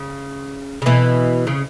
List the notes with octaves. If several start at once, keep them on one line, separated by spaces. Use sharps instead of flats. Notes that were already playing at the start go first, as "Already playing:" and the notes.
Already playing: C#3
C#3
B2 E3
C#3